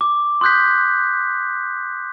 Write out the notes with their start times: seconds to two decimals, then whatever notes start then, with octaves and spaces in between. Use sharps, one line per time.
0.01 D6
0.41 C6 D#6 F#6 G6 B6